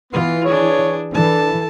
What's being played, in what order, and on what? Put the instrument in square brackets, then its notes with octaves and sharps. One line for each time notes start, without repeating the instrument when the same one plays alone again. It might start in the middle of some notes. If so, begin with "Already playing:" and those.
[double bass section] E3 [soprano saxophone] B3 [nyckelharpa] F4 C6
[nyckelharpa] D4 G#4 [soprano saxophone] C#5
[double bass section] E3 [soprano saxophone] D4 [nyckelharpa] A4 A5